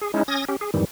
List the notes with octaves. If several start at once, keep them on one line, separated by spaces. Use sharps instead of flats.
G#4
G#3 C#4 D#4 E4
C#4 D#6 G#6 A#6
C#4 G4
G#4
F2 G#2 D#3 E3 G3